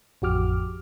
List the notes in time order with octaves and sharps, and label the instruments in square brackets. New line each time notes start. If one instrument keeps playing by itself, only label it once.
[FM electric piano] A1 F2 F#4 G4 D6 F6